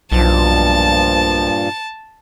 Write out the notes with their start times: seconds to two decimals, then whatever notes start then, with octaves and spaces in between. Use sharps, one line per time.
0.12 B1 G2 A#2 F3 A5